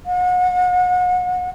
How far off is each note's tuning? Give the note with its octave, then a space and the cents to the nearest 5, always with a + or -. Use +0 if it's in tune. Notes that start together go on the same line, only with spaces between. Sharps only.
F#5 -35